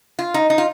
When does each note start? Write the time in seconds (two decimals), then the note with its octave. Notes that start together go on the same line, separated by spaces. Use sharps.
0.19 F4
0.34 D#4
0.50 D#4
0.58 F4